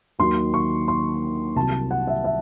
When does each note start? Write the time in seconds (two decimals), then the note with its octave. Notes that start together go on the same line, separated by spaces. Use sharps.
0.19 D#2 D#3 F#3 C6
0.54 C#6
0.88 C6
1.56 C2 C3 F#3 A5
1.91 F#5
2.07 E5
2.24 E5